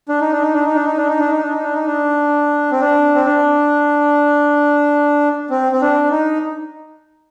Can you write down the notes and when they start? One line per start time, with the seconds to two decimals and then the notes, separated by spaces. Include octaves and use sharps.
0.09 D4
0.21 D#4
0.32 D4
0.42 D#4
0.54 D4
0.65 D#4
0.75 D4
0.87 D#4
0.97 D4
1.09 D#4
1.19 D4
1.31 D#4
1.42 D4
1.53 D#4
1.63 D4
1.75 D#4
1.86 D4
2.71 C4
2.80 D4
3.15 C4
3.26 D4
5.50 C4
5.72 C4
5.81 D4
6.11 D#4